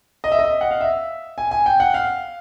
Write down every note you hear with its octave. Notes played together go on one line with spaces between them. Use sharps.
D#5
E5
D#5
F#5
F5
E5
G#5
G#5
G5
F#5
F5